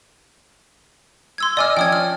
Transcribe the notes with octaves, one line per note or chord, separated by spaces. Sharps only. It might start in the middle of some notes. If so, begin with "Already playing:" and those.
C6 E6 G#6
D5 D#5 G#5 D6 E6 F6
F3 C#4 G5 D#6 G#6
F6